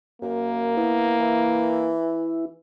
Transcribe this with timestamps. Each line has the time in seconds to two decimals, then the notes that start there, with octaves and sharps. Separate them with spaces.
0.22 F#2 A#3
0.77 B3 E4
1.20 E3